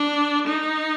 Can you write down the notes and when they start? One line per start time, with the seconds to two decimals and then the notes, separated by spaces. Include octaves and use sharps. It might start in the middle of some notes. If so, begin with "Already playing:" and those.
Already playing: D4
0.47 D#4